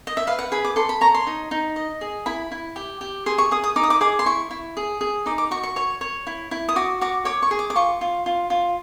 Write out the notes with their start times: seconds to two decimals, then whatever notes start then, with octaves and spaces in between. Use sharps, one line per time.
0.07 D#5
0.17 E5
0.27 B4 F5
0.39 F#5
0.52 G#4 B5
0.65 D6
0.76 A4 C6
0.89 B5
1.01 C#5 A#5
1.14 C6
1.27 D#4
1.51 D#4
1.76 D#5
2.01 G#4
2.26 E4 B5
2.52 E4
2.76 G4
3.01 G4
3.26 G#4 C6
3.38 C#6
3.51 G#4 D#6
3.64 D#6
3.76 D#4 D6
3.83 D#6
3.90 D6
4.01 G#4 D6
4.19 C6
4.26 E4 C#6
4.51 E4
4.77 G#4
5.01 G#4
5.26 D#4 D6
5.38 D6
5.51 F#4 C#6
5.63 C#6
5.76 C#5 C#6
6.01 C#5
6.27 E4
6.51 E4
6.69 D#6
6.76 F#4 D6
7.01 F#4 D6
7.25 C#5 D6
7.42 C#6
7.51 G#4
7.59 D6
7.70 D6
7.76 F4 C#6
8.01 F4
8.26 F4
8.50 F4